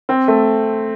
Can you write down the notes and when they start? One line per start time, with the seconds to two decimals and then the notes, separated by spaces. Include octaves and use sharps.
0.09 C4
0.28 A3